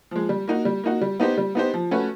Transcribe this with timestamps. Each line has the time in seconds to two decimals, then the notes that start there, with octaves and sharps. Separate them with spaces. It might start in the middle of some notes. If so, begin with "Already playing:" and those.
0.11 F3 G#3
0.29 G3
0.48 A#3 D#4 F#4
0.65 G3
0.84 A#3 D#4 F#4
1.01 G3
1.20 B3 D#4 G4 C5
1.38 G3
1.55 B3 D#4 G4 C5
1.74 F3
1.91 A3 C#4 F#4 B4